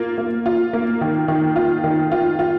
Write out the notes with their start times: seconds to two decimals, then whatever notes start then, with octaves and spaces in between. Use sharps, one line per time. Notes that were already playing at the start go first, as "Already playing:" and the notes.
Already playing: A#3 F4
0.18 A#3
0.46 F4
0.73 A#3
1.01 D#3
1.28 D#3
1.56 F4
1.84 D#3
2.12 F4
2.39 F4